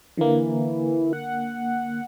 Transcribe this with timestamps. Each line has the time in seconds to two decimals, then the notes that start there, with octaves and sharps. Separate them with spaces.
0.17 D3 E3 A#3
1.13 F#5